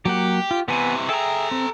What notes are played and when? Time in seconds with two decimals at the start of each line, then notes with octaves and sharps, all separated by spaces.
0.05 F#3 A#3 G4 F#5
0.51 F4
0.68 C3 E3 B3 B4 G#5
1.09 G#4 A4 E5 G5 A#5
1.51 C4